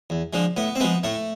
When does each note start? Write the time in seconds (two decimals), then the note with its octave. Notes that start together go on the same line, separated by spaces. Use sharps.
0.10 E2
0.33 D3 F3 G#3
0.57 A2 B3
0.75 C4
0.80 F3 G#3 B3
1.03 A2 A3